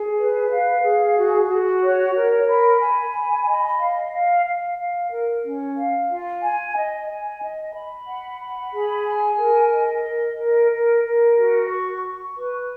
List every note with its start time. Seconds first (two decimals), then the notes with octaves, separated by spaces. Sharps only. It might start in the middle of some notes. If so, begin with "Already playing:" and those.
Already playing: G#4
0.18 B4
0.51 F5
0.84 G#4
1.17 F#4
1.49 F#4
1.82 C#5
2.15 A#4
2.49 B5
2.81 G#5
3.14 B5
3.47 D#5
3.79 F5
4.13 F5
4.46 F5
4.78 F5
5.12 A#4
5.44 C#4
5.77 F5
6.09 F4
6.43 G#5
6.76 D#5
7.09 G#5
7.42 D#5
7.75 B5
8.08 F#5
8.40 B5
8.73 G#4
9.05 G#5
9.40 A#4
9.72 D#5
10.05 A#4
10.38 A#4
10.71 A#4
11.04 A#4
11.37 F#4
11.69 C#6
12.02 C#6
12.36 B4